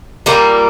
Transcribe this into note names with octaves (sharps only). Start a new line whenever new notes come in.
A#2 G3 A#3